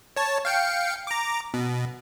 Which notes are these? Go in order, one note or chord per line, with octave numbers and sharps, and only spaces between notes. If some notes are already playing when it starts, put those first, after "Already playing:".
C#5 A5
F5 G5 C#7
A#5 D6
B2